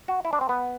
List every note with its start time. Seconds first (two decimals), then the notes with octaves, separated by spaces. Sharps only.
0.08 F#4
0.25 E4
0.33 D4
0.41 C4
0.49 B3